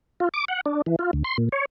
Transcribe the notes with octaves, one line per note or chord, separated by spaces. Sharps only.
F4
D6
F#5
D4
E3
F4
D2
C6
A#2
C#5